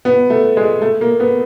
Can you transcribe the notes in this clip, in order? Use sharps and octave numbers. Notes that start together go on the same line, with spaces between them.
B3
A3
G#3
A3
A#3
B3